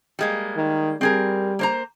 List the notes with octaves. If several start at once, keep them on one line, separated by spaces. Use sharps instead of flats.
G3 G#3 A#3
D#3
G3 C4 G#4 A#4
A#3 C5 A#5